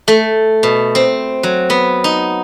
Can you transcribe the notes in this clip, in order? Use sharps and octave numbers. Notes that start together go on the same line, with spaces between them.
A3
B2
C4
F#3
B3
D#4